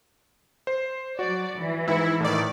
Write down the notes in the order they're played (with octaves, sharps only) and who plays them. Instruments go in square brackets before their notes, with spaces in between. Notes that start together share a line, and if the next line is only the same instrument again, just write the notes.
[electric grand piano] C5
[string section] F#3 D5 [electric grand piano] F#4
[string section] E3
[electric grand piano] G#2 C#7 [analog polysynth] E4
[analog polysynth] A2 D#3 D5